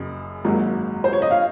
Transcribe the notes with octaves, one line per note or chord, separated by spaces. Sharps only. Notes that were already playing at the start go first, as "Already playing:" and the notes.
Already playing: F#1 F#2 C#3
G#1 G#2 F#3 A#3
C5
C#5
D#5
F5